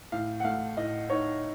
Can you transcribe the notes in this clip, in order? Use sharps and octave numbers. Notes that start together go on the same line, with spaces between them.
A2 F5
F#5
A3 F5
A2 D#5
D#4 C#5